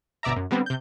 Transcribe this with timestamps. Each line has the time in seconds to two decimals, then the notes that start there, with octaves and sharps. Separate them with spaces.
0.23 G1 B2 D5 E5 A#5
0.36 F#2
0.51 D3 G3 B3 C4
0.66 C3 G6